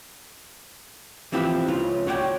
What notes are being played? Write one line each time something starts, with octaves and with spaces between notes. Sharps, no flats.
E3 F3 C4 E4 G4 B4
C#2 C#3 F4
F#4 C#5 D5 F#5 G5